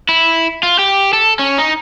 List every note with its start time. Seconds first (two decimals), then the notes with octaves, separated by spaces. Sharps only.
0.09 E4
0.63 F4
0.79 G4
1.13 A4
1.39 C#4
1.58 D#4